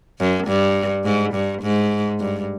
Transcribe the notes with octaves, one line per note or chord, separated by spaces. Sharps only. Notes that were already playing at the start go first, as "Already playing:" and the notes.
F#2
G2
G#2
G2
G#2
G2